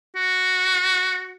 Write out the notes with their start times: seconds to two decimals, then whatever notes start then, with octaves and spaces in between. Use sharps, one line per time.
0.16 F#4